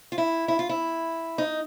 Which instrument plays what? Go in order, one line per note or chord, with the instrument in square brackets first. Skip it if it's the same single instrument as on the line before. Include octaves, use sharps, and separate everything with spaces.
[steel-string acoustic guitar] F4
E4
E4
F4
E4
D#4